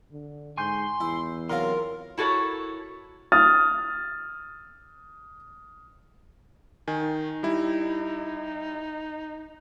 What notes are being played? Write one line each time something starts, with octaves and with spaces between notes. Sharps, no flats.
D3
G#2 G#5 C6 C#6 G6
E2 E4
C3 F#3 F4 A#4 C6
E4 F#4 A4 A#4 C#5
D#6 F6 A6
D#3 D#4 G#5
G3 E4